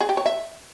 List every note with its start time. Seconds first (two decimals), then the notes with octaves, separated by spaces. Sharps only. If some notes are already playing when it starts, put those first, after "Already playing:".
0.01 G#4
0.09 G4
0.17 C#5
0.26 E5